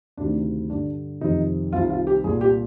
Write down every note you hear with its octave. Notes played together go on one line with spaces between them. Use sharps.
D2 C3 D#3 D4
G2 D3 D4
F2 C3 D#3 D#4
C2 C3 D#3 F4
F4
G4
C2 A#2 G#4
G4